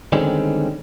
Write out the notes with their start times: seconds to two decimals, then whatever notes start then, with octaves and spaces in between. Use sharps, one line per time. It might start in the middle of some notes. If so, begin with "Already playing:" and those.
0.12 D3 D#3 G3 G#3 C4 C#4